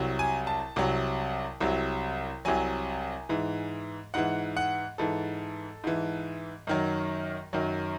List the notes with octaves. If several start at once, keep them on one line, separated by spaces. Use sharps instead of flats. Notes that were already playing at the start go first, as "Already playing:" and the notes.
Already playing: C2 C3 F#3
G#5
A5
C2 C3 F#3
C2 C3 F#3
C2 C3 F#3 G#5
G#2 E3
G#2 E3 F#5
F#5
G#2 E3 A4
G#2 E3
F#2 D#3 F#3
F#2 D#3 F#3